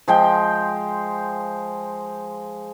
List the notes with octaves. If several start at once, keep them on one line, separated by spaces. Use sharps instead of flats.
F3 G#3 G5